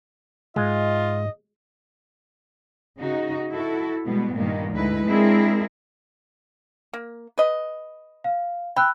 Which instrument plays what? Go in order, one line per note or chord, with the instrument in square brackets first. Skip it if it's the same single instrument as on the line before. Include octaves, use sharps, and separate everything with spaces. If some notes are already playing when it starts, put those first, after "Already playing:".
[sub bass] G#2 [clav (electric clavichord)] G#3 [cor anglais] F4 [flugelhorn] D#5
[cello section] C#3 D#4 F#4
E4 F#4 A4
B2 G3 G#3 B3
G2 A#2 D#3 A#3 B3 D#4
D2 G#3 D#4 E4 B4
G#3 C4 D4 E4 G#4 A#4
[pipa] A#3
B4 D#5
[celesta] F5
[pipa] G5 [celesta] B5 E6 F#6